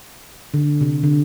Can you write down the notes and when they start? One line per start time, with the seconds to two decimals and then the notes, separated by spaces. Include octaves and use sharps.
0.54 D3
0.81 C3
1.03 D3